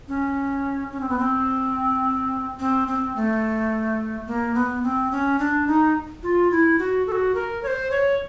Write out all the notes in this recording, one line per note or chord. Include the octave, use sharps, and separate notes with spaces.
C#4
C#4
C4
B3
C4
C4
C4
A3
A#3
B3
C4
C#4
D4
D#4
F4
E4
F#4
A4
F#4
A#4
C#5
C5
C#5